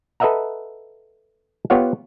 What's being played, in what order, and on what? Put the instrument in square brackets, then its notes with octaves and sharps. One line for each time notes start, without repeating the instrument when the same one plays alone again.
[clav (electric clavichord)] A4 B4 D#5 E5 F#5 A#5
B3 F4 G4 C#5 F5 F#5